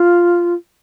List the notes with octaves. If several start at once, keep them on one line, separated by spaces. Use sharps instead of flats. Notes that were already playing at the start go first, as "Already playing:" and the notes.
Already playing: F4